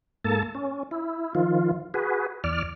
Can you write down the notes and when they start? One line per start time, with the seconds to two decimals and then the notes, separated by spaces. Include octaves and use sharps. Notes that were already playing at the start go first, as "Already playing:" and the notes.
0.24 G#2 A#3 A4 A5
0.55 C#4
0.91 E4
1.35 D#3 F3 F4
1.94 F#4 G#4 B4
2.44 E2 D5 F6